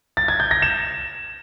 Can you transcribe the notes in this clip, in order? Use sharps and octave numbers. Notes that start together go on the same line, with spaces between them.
A6
G#6
G6
A#6
E7